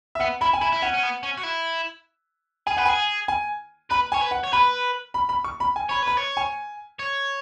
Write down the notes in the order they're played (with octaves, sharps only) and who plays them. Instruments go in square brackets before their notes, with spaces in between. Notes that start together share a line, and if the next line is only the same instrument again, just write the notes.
[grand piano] E5
[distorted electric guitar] B3 [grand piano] F#5
[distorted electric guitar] E4 [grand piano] B5
[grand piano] G#5
[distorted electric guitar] E4 [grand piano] B5
[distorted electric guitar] E4
[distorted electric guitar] C#4 [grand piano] F#5
[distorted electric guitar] C#4
B3
C#4
F#4
E4
[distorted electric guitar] G#4 [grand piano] G#5
[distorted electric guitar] B4 [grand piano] F#5
[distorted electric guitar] G#4 [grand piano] G#5
[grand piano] G#5
[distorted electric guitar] B4 [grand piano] B5
[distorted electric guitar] C#5 [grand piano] G#5
[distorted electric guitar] B4
[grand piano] F#5
[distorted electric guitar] C#5
[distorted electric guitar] B4 [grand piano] B5
[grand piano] B5
B5
C#6
B5
G#5
[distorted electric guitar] C#5 [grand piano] B5
[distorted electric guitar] B4 [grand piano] B5
[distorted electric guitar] C#5
[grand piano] G#5
[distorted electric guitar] C#5